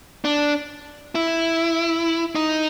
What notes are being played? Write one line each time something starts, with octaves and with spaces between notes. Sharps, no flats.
D4
E4
D#4